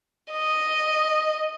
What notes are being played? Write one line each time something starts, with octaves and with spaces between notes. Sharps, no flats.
D#5